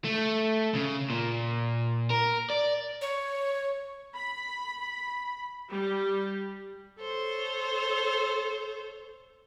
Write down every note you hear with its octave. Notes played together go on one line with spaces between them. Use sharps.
A3
C#3
A#2
A#4
D5
C#5
B5
G3
A4 C5 C#5